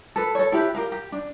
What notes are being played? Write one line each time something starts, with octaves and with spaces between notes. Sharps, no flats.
A4 B4
A4 C#5
E4 G4 B4
G4 A#4 F5
G4
D4